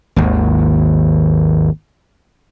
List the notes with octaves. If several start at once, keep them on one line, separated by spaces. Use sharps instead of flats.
G#1 D#2